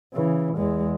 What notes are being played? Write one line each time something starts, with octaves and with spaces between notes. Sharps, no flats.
C#3 E3
E2 G#3